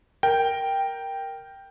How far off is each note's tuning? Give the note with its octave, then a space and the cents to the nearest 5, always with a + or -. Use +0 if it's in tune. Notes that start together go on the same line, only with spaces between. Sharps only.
A#4 +0 G5 +0